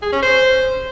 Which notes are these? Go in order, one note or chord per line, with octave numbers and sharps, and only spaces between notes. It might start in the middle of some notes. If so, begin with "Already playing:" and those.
G#4
C#4
C5